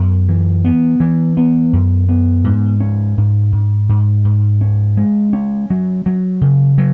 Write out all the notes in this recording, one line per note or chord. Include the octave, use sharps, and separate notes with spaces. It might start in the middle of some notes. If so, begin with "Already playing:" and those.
Already playing: F#2 B3
E3
B3
E3
B3
F#2
B3
G#2
C#4
G#2
G#2
G#2
G#2
C#4
G#3
C#4
F#3
F#3
C#3
F#3